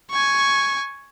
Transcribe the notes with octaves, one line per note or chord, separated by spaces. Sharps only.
G#5 C#6